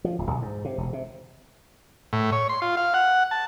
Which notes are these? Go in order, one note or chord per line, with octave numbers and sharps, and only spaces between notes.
F3
D1
B1
G#2
C3
E1
C3
A2
C#5
C6
F4
F5
F#5
A5